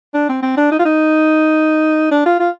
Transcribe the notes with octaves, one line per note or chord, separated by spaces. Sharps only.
D4
C4
C4
D4
D#4
F4
D#4
D4
F4
F4